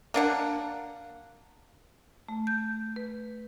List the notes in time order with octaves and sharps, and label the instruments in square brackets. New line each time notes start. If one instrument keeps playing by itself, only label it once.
[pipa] A#3 D4 F#5
[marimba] A3
G6
B4